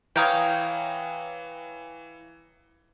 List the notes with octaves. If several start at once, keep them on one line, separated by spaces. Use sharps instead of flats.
E3 C#5 F5 G5 A#5 D#6